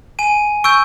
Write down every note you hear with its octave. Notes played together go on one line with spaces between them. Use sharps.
G#5 D#7
C#6 E6 G6 D7